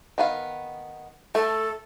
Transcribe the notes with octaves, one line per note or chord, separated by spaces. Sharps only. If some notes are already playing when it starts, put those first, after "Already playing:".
D#3 B3 F5
A3 A4